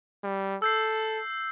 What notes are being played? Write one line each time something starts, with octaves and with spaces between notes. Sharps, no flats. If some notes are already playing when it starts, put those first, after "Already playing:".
G3
A4 E6 G6 C7